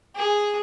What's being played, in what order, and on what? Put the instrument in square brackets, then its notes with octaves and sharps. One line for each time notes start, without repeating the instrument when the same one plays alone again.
[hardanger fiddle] G#4